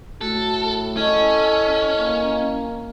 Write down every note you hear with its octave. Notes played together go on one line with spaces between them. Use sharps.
A2 A3 F#4 A4
C#4 E4 A4 D#5 C#6
A#3